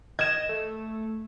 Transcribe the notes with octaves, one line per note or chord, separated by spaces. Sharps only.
D#5 G#6 E7
A3